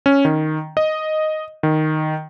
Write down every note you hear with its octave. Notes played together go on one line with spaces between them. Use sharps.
C#4
D#3
D#5
D#3